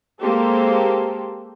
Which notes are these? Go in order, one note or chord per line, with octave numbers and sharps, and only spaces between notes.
G#3 A#3 C4 G4 A4 C5